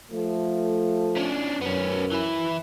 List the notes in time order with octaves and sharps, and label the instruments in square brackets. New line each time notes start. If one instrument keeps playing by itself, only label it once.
[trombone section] F3 A3
[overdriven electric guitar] C#4 D4
[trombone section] F#2 [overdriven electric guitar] B3 C#4
[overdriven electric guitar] E3 E4